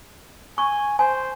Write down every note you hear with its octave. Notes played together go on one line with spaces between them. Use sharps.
G#5 C#6
C5 G#5